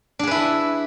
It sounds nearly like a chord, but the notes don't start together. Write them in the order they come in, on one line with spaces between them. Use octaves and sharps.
D4 G#4 B4 E4